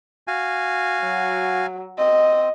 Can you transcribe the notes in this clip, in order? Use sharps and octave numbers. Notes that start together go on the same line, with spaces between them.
F#4 F5 G#5
F#3
C4 D#5